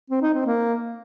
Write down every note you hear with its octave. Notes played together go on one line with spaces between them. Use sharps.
C4
D#4
C4
A#3